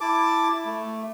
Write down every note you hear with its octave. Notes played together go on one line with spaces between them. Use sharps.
E4 A5 D6
A3